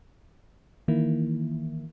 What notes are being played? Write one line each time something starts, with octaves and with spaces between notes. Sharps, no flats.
D#3 E3 A#3 E4